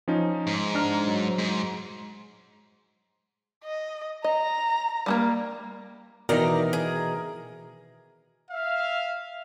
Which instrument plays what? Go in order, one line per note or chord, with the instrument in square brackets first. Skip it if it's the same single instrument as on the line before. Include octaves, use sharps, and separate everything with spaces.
[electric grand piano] F3 C#4 D#4
[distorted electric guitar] G#2
[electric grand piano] D4 A#5 F6
F#3
[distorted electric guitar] G#2
[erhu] D#5
[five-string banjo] D#5 [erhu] A#5
[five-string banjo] G3 A3 A#3
[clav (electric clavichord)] B2 D#3 E3 [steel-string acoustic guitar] D#4 D5 A#5 [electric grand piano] A#4
[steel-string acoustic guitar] G#4
[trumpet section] E5 F5